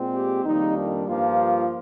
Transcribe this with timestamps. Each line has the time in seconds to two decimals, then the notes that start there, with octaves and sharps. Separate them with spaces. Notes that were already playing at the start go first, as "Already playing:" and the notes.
Already playing: A#2 G#3 C4
0.14 G4
0.44 F2 D#3 G3 A#3 D#4
0.76 D4
1.07 G2 F3 A#3 F4